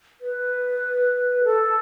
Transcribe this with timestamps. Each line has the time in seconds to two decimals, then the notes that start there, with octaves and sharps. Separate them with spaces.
0.21 B4
1.44 A4